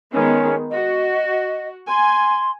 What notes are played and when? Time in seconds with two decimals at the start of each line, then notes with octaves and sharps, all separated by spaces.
0.12 D#3 G#3 B3 C#4
0.70 F#4 D#5
1.88 G#5 C6